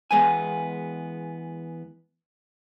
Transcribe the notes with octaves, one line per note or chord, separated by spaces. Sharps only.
E2 G#3 B3 G#5